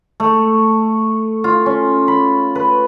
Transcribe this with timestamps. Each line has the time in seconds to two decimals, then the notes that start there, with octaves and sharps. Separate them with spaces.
0.20 A3
1.44 F4
1.66 C#4
2.08 B5
2.55 B4